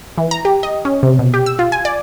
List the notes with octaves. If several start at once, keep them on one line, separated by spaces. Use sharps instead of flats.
E3
A#5
G4
D#5
C#4
C3
B2
G4
E6
F4
G#5
D5